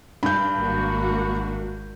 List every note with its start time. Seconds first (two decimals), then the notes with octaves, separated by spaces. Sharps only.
0.23 G2 B5 G6
0.58 G#1 A#3 F#4